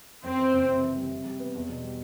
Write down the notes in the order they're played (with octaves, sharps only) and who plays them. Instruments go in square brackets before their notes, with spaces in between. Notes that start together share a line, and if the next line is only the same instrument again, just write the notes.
[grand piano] F#2 [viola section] C4
[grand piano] E3
F#1
C3
E3
G3
C3
G3
B3
E2
B2
G3